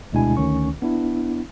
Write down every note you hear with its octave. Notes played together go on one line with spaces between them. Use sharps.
D2 B2 G#3 D4 E4 G#5
D2 D#3 C#4 C#6
B3 D4 E4